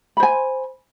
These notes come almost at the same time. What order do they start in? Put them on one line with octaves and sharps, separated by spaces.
B5 C5 G#5